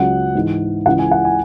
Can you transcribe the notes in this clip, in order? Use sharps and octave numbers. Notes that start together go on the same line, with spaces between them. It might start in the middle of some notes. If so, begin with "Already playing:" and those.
Already playing: C#2 C#3 F#3 F#5
G#2 E3
C#2 C#3 E3 F#5
G#5
F#5
G#5